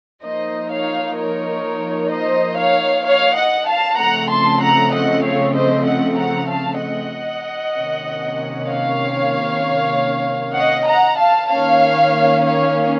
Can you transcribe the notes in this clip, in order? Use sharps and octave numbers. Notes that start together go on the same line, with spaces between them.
F3 A#3 D#4 C5 D#5
C#5 F5
A#4 C#5
C5 D#5
C#5 F5
C#5 F5
D#5 F#5
F5 A5
C#3 F3 A3 C4 F#5 A#5
A5 C6
F#5 A#5
D#5 F#5
C#5 F5
C5 D#5
D#5 F#5
F#5 A#5
F5 A5
D#5 F#5
C3 D#3 A#3 C#4
C#5 F5
D#5 F#5
F#5 A#5
F5 A5
D#3 A#3 C#4 C#5 F5
C#5 F5